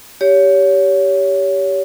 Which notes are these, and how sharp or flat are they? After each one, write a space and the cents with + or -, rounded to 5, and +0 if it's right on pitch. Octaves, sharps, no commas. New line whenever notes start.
G4 +0 C#5 +25